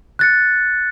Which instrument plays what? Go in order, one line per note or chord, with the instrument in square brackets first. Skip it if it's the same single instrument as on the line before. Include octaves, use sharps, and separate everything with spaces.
[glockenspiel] F#6 A6 C#7